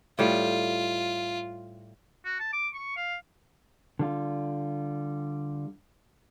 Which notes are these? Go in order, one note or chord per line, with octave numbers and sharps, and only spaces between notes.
A2 G3 F4
F#4
A5
D6
C#6
F5
D3 G3 F4